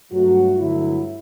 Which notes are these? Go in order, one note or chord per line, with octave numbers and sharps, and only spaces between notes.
G2 F#3 A3 F#4
G2 D3 F#3 A3 E4